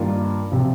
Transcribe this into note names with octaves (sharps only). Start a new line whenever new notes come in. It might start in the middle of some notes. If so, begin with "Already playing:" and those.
Already playing: G2 D#3 A#3 F4
C3 F3